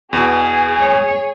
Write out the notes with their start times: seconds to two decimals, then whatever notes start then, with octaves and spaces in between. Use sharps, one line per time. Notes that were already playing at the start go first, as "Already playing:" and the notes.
0.13 E2 B2 G#4 G#5
0.80 C#5